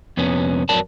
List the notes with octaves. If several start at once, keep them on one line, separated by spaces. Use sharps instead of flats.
F2 C3 B3 C#4
F2 F#3 A#4 D5 A5